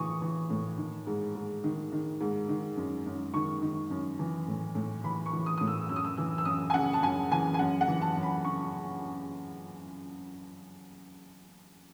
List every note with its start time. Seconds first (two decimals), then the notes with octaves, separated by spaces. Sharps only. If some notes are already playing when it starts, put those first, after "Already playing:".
Already playing: A2 E3 C#6 D#6
0.22 E3
0.50 A2
0.78 D#3
1.07 G#2
1.35 G#2
1.64 D#3
1.92 D#3
2.20 G#2
2.49 D#3
2.76 F#2
3.06 F#2
3.34 D#3 C#6
3.62 D#3
3.90 F#2
4.19 E3
4.48 A2
4.75 A2
5.04 E3 B5
5.26 C#6
5.33 E3
5.46 D#6
5.58 A2 D#6
5.67 E6
5.89 F#2 E6
5.96 D#6
6.05 E6
6.17 E3 E6
6.38 E6
6.45 F#2 D#6
6.70 G#5
6.74 C#3 F#5
6.93 A5
7.02 F#2 G#5
7.31 E3 G#5
7.54 G#5
7.59 F#2 F#5
7.81 F#5
7.88 E3
8.01 A5
8.16 F#2
8.23 B5
8.45 C#3 C#6